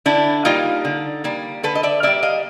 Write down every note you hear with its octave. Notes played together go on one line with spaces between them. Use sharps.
D3 D4 E4
G3 A#3 D#4 F4
D3
G3 A#3
D3 A4 B4
D#5
D5 E5
G3 A#3 D5 E5
D#5 F5